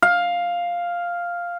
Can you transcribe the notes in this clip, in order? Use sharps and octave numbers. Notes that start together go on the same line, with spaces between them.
F5